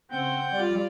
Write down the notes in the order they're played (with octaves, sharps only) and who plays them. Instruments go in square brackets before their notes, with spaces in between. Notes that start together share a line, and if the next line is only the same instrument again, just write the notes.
[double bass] C#3 [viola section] C4 [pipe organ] F#5 G5 G6
[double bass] G3 [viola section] F4 D5